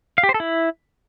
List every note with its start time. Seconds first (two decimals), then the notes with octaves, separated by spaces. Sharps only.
0.18 F5
0.23 G4
0.29 C5
0.34 A4
0.40 E4